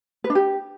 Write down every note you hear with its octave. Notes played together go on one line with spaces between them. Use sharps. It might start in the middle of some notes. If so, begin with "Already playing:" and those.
B4
D4
G4